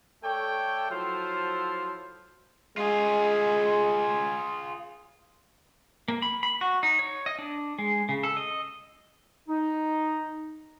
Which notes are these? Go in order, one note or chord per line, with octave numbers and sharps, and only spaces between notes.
A3 A4 C#5 D5 G5
F3 F#3 E4 F4 A4 C5
G#3 F4 G#4
A#3
B5
B5
F#4
D#4
C#5
D#5
D4
G#3
C#3
A4
D#5
D#4